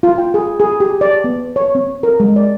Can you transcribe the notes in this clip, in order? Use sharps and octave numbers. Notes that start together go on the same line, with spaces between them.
F4
G5
G#4
G#4
G4
D5
B3
C#5
C4
A#4
G#3
D5